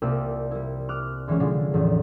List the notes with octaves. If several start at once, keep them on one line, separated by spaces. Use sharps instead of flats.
C2 A#3 F4 G4 D5 E6
G3 E4
D6 D#6 F6 F#6
D3 E3 G3 G#3 C#4
D3 E3 F3 G#3
A1 E2